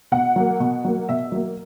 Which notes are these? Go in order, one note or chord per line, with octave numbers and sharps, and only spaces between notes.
B2 F#5
F#3 A#3
B2
F#3 A#3
B2 E5
F#3 A#3